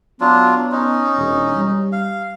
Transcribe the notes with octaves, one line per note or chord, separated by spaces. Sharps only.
F#3 B3 D4 F4
C#4 D#4
E1
G3
F5